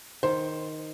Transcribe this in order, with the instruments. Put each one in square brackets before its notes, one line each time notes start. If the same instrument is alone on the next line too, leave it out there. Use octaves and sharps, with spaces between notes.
[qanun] D#3 [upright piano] C5